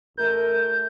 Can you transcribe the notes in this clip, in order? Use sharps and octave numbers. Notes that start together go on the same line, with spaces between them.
A1 A3 A#4 G6